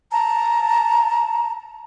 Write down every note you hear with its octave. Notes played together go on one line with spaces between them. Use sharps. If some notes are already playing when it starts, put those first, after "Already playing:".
A5 A#5